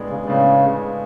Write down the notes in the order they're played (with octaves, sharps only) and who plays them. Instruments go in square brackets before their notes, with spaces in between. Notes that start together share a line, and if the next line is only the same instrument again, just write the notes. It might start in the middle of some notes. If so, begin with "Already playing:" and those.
Already playing: [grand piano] A2 G#3 B3 D4
[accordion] C#3
[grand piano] A2 G#3 B3 D4 [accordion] C#3